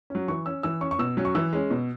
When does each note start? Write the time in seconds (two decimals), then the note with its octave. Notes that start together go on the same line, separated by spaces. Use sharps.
0.10 F#3 C#4
0.28 E3 C#6
0.46 C#4 E6
0.63 E3 E6
0.81 C#4 C#6
0.91 C#6
0.99 B2 E6
1.17 F#3 C#4
1.25 C#6
1.35 E3 E6
1.53 G#3 C#4
1.71 B2